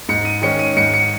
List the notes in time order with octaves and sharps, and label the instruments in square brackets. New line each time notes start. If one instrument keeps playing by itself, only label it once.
[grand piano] G#2 C#7
D#7
D#3 G#3 C#4 C#7
D#7
G#2 C#7
C#7